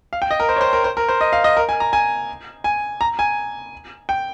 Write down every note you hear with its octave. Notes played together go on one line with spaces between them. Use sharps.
F5
G5
D#5
A#4
C5
C#5
C5
A#4
C5
A#4
C5
D#5
F5
D#5
A#4
G#5
A#5
G#5
G#5
A#5
G#5
G5